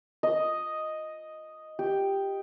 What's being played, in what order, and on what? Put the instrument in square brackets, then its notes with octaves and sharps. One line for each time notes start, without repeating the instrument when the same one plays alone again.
[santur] D#5
G4